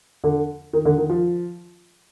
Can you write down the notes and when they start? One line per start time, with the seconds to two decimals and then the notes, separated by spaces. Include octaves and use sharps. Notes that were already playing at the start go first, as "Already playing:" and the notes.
0.24 D3
0.73 D#3
0.85 D3
0.98 D#3
1.10 F3